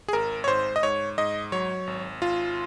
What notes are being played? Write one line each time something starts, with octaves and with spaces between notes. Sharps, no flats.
G#4
G#1 A#4
C#5
G#2 C5
D#5
G#2 C#5
G#2 D#5
F#3 C#5
G#1
G#1 F4